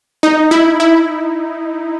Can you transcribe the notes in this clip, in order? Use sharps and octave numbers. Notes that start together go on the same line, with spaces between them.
D#4
E4
E4